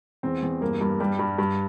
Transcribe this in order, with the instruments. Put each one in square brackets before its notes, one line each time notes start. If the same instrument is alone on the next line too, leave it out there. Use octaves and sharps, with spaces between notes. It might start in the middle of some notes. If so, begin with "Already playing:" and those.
[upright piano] E2 C4
E2
G2 A#3
G2
G2 G3
G2
G2